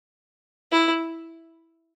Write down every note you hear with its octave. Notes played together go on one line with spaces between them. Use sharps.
E4